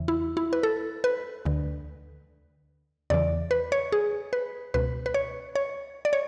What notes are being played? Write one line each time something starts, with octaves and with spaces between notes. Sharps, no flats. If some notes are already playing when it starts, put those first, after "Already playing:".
Already playing: E2 C#3 E3
E4
E4
B4
A4
B4
D2 D3
E2 C#3 E3 D5
B4
C#5
G#4
B4
C#2 B2 B4
B4
C#5
C#5
D5
C#5